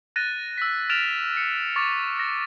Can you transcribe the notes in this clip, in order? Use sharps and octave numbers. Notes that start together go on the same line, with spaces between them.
F#6 A6 A#6 D#7
E6 B6
F6 A6 D7 E7 F7
C#7
C#6 D6 A6
A#6